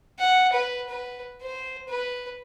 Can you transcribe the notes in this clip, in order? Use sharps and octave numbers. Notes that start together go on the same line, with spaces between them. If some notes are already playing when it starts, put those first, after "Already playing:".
F#5
B4
B4
C5
B4